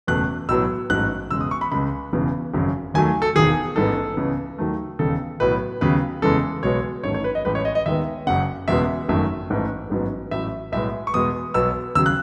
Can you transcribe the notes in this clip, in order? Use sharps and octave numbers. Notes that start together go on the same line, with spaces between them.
F#1 E2 B2 A3 F#6
B1 A2 F#3 B3 E6
A1 G#2 F#3 A3 F#6
E1 E2 C#3 G#3 E6
D#6
C#6
B5
C#2 C#3 G#3 B5
E1 E2 C#3 E3 B3
G#1 F#2 C#3
D#2 D#3 F#3 A3 G#5
A4
E1 D#2 D#3 G#4
A1 G#2 E3 B3 A4
C#2 C#3 E3 B3
D#2 D#3 F#3 A3
E1 D#2 C#3 A4
B1 A2 F#3 B3 B4
D#2 C#3 F#3 B3 B4
F#1 E2 C#3 E3 G#3 A4
B1 B2 G#3 B3 C#5
A1 G#2 D#3 A3 C#5
C#5
B4
D#5
A1 A2 G#3 B4
C#5
D#5
D#5
D#2 D#3 G#3 B3 E5
F#1 F#2 C#3 F#5
F#1 E2 B2 G#3 B3 E5
G#1 F#2 D#3 A3 E5
A1 G#2 E3 A3
A1 G#2 F#3 B3
A1 A2 F#3 E5
B1 A2 G#3 B3 E5
C#6
E2 B2 G#3 B3 D#6
B1 B2 F#3 B3 E6
D#2 C#3 F#3 E6
F#6